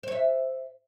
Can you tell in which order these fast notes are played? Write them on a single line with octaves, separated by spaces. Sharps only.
C5 C#5 E5